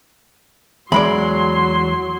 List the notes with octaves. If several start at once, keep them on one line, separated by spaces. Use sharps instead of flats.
E2 F#3 G#3 D5 B5 C6